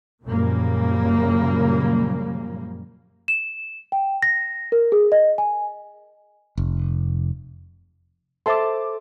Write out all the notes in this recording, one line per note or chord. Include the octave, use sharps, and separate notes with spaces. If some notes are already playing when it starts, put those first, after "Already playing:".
F#2 A#2 C#3 F3 G3 A#3
E7
G5
A#6
A#4
G#4
D#5
G#5
F1
A4 C5 E5 A5 C6 D6